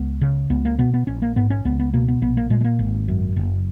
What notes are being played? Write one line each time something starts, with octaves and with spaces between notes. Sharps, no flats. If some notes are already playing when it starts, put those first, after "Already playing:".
Already playing: C#2 B3
C#3
C#2 B3
A#3
B2 B3
B3
A#1 C#4
A#3
G#2 B3
C#4
C#2 B3
B3
B2 A#3
B3
A#1 B3
A#3
A#2 G#3
G#3
A#3
G#1
F#2
F#1